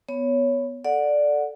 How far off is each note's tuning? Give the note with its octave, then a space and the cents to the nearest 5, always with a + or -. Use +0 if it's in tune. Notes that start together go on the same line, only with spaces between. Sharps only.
B3 +5 C#5 +10
A4 +0 D5 +0 F#5 -15